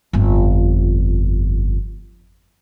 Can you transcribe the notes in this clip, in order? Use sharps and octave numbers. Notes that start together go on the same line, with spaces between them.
G1 F2